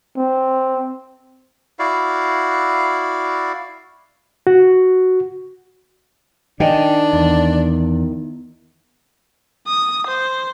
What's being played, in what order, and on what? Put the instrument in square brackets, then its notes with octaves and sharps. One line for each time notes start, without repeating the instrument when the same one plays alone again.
[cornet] C4
[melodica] E4 F#4 D5 F5
[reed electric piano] F#4
[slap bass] D#3 [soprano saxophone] D4 [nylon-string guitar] D#5 G5 G#5
[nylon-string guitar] E2
[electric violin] D#6
C5